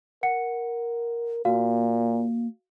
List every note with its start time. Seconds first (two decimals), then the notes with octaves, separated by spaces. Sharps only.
0.23 A#4 F#5 C#7
1.45 A#2 A#3 F#4 F5